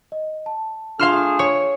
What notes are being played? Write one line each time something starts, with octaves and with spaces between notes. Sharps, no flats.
D#5
A5
A3 D4 F4 G#4 F5 C6 F6 E7
C#5